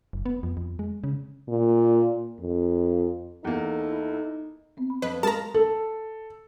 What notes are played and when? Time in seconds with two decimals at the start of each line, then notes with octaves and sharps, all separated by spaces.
0.13 F#1
0.26 B3
0.43 F2
0.57 F2
0.79 G#3
1.04 C#3
1.48 A#2
2.40 F2
3.44 E2 A#3 D#4 E4 A4
4.77 B3 C4
4.90 B5
5.02 F2 B4 D#5 F5
5.23 G#3 A#4 F5 A5 A#5
5.54 A4